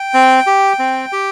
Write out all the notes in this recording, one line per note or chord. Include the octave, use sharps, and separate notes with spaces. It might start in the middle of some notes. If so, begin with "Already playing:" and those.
Already playing: G5
C4
G4
C4
G4